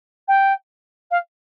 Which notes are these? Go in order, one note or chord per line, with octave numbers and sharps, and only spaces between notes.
G5
F5